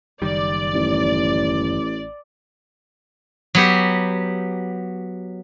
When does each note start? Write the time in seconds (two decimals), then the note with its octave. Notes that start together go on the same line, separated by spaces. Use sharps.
0.22 F#1 D#3 G3 D5
0.74 A1
3.55 F#3 B3 G4